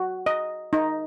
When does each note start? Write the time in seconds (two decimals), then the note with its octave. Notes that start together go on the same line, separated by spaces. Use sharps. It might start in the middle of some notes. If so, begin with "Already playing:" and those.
Already playing: F#4
0.26 D#5
0.73 D#4